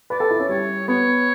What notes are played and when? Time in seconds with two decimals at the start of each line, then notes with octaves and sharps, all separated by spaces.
0.10 B4 D5
0.20 A4
0.31 E4
0.40 C#4
0.49 G3 C#5
0.88 B3 C#5